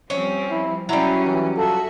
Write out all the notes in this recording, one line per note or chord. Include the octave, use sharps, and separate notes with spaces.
F3 G3 C4 C#4
E4
F#3 G3 C#4 E4
E3
F4 F#4 G#4 A4 E5